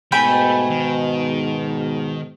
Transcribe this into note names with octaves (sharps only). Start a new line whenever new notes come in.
G#2 B2 A3 G5 G#5 B5
D#3